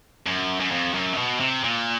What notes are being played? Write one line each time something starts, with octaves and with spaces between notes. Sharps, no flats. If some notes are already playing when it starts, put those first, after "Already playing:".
F#2
F#2
F2
F#2
C3
B2
C3
A#2